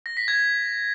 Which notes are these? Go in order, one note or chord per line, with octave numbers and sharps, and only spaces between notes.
A#6
B6
G#6